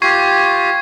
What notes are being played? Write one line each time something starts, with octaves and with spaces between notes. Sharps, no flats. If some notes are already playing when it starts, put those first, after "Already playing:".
F4 G4 C#6 G#6 C7